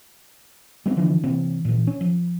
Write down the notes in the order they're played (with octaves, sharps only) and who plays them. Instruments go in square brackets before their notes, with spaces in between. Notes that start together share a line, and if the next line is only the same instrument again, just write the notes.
[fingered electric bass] G3 B3 C4
D3 E3 F3 D4
C3 E3 A#3 C4
A#2 E3
C#4
F3